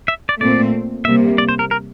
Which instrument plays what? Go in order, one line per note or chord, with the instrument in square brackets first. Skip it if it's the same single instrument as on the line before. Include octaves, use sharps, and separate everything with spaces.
[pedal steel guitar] E5
D5
[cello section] A#2 A3 C4 [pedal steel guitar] D5
[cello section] C3 G3 A#3 [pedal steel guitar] E5
[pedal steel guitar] D5
C5
A#4
A#4